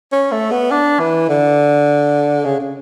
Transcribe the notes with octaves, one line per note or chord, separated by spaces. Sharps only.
C#4
A3
B3
D4
E3
D3
C#3
C#3